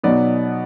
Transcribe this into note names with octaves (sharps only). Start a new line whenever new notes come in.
B2 F#3 B3 D#4 D5